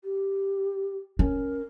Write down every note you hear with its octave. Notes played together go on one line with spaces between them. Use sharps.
G4
C#4 A#4